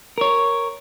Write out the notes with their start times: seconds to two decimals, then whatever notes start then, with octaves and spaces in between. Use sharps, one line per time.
0.18 A#4 C#5